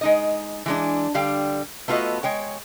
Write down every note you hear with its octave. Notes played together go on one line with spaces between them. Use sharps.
G#3 D#4 D#5
E3 G#3 D4
D3 G3 F5 G5
A3 B3 F4 F#4 A4 D#5
G#3 C#5 G5